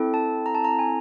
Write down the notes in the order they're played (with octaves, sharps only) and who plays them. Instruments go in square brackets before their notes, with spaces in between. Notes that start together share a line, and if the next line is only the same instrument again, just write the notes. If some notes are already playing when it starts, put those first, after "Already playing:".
Already playing: [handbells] C4 E4 A4
A5
A#5
A5
A#5
G#5